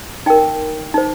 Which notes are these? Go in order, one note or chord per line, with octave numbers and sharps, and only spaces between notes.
D#4 A#4 G5
D#4 C5